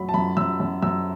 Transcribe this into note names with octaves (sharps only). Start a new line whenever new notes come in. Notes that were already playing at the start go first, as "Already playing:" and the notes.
Already playing: F#2 F#3 A3 B5
A5
F#2 B5
F#2 E6
F#2
F#2 E6